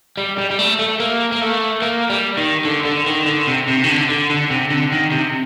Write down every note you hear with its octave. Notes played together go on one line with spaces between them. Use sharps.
G3
G3
G3
A3
A3
A#3
A#3
A3
A#3
G3
D#3
D3
D3
D#3
D3
C3
C3
D#3
D3
D3
D3
C3
D3
D#3
C3